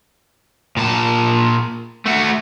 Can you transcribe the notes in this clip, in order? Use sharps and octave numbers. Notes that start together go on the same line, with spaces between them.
A#2 A5
A3 F#4